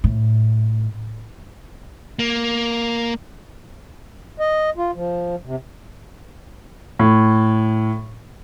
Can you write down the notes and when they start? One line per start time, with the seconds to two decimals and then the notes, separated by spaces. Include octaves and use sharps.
0.04 A2
2.19 A#3
4.40 D#5
4.77 F4
4.95 F3
5.46 C3
6.99 A2